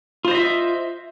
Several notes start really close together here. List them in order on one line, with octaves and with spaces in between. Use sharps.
F4 C5 D#5 E5